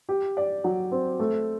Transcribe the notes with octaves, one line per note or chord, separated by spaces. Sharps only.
G4
D5
F#3
C4
A3